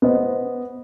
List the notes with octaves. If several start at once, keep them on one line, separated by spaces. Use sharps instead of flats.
B3 C5 D#5